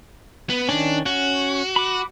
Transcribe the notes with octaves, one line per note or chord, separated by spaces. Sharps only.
B3
D#3 C#4 D4
C#4 F#4 F#6
B5 D6